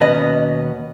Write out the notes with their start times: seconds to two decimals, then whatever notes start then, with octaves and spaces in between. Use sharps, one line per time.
0.01 D#2 B2 B3 C#4 D#5